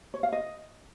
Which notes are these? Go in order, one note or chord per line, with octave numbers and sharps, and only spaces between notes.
C#5
F5
D#5